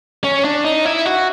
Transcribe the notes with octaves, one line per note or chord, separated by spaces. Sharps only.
C#4
D4
D#4
E4
F#4